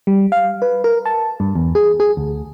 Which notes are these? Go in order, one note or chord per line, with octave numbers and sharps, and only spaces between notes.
G3
F5
B4
A#4
A5
G2
E2
G#4
G#4
D2